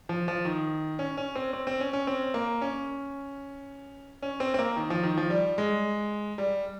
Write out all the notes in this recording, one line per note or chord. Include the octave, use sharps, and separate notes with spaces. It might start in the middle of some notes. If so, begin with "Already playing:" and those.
F3
F3
D#3
C#4
C#4
C4
C4
C4
C#4
C#4
C4
A#3
C#4
C#4
C4
C4
A#3
D#3
F3
D#3
F3
G3
G#3
G3